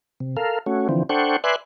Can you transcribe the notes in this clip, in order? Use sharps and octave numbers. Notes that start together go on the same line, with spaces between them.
C3
A4 A#4 F5
A3 C#4 F#4
D3 E3 F3 C4
D4 A4 C5 F#5 G5 C#6
B4 D5 E5 G#5 C6 F#6